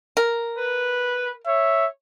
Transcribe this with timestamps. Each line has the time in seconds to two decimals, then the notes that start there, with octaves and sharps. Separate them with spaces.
0.17 A#4
0.58 B4
1.47 C#5 E5